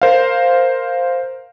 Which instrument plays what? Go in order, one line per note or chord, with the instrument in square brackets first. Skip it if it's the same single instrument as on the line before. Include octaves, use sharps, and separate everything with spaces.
[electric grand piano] A#4 C5 F5